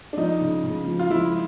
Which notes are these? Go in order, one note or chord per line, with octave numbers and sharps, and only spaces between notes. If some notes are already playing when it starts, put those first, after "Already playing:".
D4
F3 D#4
C#3
C#3
F3
F4
F3 E4